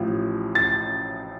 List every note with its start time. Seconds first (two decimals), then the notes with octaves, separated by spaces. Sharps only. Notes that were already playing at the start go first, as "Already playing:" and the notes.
Already playing: A1 A2 F3
0.55 A6